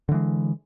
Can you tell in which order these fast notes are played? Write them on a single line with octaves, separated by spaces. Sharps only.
D3 E3 G#3